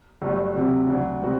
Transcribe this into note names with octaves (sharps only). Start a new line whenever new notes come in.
G1 G2 F#3 A3
D2 C3 F#3
D2 D3 F#3
C3 G3 C4 F#4